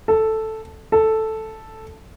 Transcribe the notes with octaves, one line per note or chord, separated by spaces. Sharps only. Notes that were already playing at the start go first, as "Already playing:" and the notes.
A4
A4